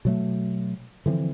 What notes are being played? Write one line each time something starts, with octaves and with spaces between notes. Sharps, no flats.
B2 F#3 A3
D3 E3 F3 C4